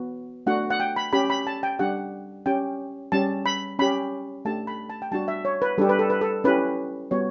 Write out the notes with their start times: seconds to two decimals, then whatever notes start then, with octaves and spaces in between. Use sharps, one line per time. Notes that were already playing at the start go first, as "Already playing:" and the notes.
Already playing: B3 F#4
0.46 A3 D4 F#4 F#5
0.70 F#5
0.80 G5
0.96 B5
1.13 C#4 G4 B5
1.30 B5
1.47 A5
1.63 G5
1.79 G3 D4 G4 F#5
2.46 C#4 G4 G5
3.12 G3 C#4 G4 A5
3.46 B5
3.79 C#4 G4 B5
4.45 A3 D4 G4 A5
4.67 B5
4.90 A5
5.02 G5
5.12 G3 D4 F#4 A5
5.28 E5
5.45 C#5
5.62 B4
5.78 G3 D4 G4 A4
5.89 B4
5.99 A4
6.10 B4
6.21 A4
6.44 C#4 E4 G4 B4
7.11 G3 B3 F#4 C#5